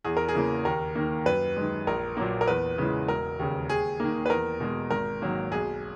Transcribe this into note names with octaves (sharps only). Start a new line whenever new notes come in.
E2 G#4
A#4
G#4
C#3 E3 A#3
D#2 A#4
D#3 A#3
F#2 B4
D#3 G#3
A#1 A#4
A#2 F#3 A#3
A#4
E2 B4
C#3 E3 G#3
E1 A#4
D#2 C#3
D#2 G#4
D#3 A#3
B4
E2 A#4
B2 G#3
G#1 A#4
G#2 D#3 F#3 A#3
B1 G#4